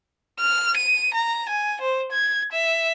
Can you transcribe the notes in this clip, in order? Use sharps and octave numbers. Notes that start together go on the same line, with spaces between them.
F6
D#7
A#5
G#5
C5
G#6
E5